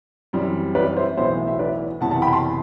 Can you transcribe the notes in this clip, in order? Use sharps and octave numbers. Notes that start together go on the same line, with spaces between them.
F#2 E3 G3 C4
B4 D5
C5 E5
B1 A2 E3 B3 C5 E5
E5
B4 D5
F#1 E2 C3 E3 F#5 A5
F#5 A5
G5 B5
A5 C6